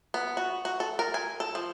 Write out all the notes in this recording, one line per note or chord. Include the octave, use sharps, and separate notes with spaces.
B3
F#4
F#4
A4
A#4
G#5
A4
F3